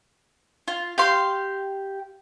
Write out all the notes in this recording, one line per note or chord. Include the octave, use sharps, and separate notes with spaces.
F4
G4 F5 C6